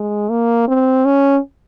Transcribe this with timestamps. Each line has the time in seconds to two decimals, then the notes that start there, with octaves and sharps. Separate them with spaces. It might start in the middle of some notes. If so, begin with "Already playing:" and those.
Already playing: G#3
0.30 A#3
0.68 C4
1.05 C#4